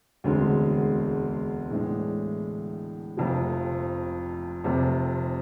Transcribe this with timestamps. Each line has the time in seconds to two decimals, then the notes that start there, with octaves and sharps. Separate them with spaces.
0.24 E1 D2 D3 G#3 C4
1.70 A2 E3 G#3 D4
3.17 F1 F2 C3 F3
4.64 F1 F2 C3